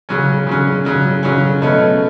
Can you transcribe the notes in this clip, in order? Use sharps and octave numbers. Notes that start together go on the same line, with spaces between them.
C#3 F#3 C#4
C#3 F#3 C#4
C#3 F#3 C#4
C#3 F#3 C#4
B2 F#3 A3 C#4